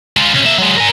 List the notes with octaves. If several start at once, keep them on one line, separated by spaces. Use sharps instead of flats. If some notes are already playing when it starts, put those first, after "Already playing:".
G#3 F4
C3 C#4
A#3 E5
F#3 G#3
A#4 G#5